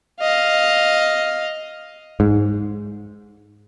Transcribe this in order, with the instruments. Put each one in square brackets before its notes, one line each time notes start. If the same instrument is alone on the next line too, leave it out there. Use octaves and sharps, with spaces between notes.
[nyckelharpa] D#5 F5
[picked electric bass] G#2